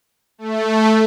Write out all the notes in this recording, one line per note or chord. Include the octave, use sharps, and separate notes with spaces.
A3